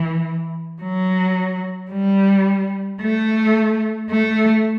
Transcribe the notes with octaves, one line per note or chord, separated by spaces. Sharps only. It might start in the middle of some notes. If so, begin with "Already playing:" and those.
Already playing: E3
F#3
G3
A3
A3